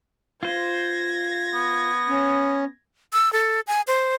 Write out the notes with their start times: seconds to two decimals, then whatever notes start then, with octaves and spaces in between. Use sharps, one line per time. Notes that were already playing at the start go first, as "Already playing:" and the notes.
0.43 F4 C5 G#6 A#6
1.54 B3
2.09 C#4
3.13 E6
3.33 A4
3.67 G#5
3.87 C5